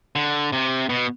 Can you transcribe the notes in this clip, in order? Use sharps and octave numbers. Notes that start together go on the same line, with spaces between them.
D3
C3
B2